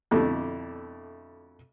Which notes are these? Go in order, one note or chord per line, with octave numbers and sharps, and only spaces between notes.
F2 B2 D3 A3 E4